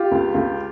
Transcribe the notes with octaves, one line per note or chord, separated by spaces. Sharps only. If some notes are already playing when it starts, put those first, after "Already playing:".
Already playing: F4 G4
C#2
C#2